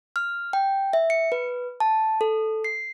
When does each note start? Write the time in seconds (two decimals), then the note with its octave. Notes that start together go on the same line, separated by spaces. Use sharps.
0.16 F6
0.53 G5
0.93 E5
1.10 C#7
1.32 B4
1.80 A5
2.21 A4
2.64 C7